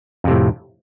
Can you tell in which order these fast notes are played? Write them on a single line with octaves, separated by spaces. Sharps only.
F2 C3 A2